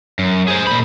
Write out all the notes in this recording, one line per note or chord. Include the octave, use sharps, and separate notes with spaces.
F#2
G#4 C5
A#2 B5